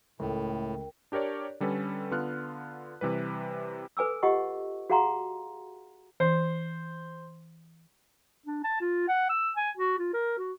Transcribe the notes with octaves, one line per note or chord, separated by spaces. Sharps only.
C#2 A2 A3 A#4 G5
D4 G4 A#4 C#5 D5
D3 G3 C#4 A4 B4
D3 B3 F4 F6 F#6
C3 E3 G3 B4
A4 B4 G#5 D6 E6
F4 G4 D#5 F#5 C#6
F#4 G#4 F5 F#5 A#5 C6
E3 C5
D4
A5
F4
F#5
E6
G#5
F#4
F4
A#4
F#4